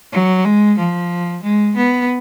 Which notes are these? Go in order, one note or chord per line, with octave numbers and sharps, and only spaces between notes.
F#3
G#3
F3
G#3
B3